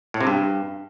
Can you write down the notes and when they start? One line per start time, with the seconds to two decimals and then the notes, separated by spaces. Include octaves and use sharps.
0.14 A2
0.20 C3
0.27 G2